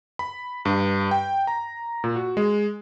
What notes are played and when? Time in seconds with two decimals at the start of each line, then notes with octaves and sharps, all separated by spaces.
0.19 B5
0.65 G2
1.11 G5
1.47 A#5
2.04 A#2
2.16 F#4
2.37 G#3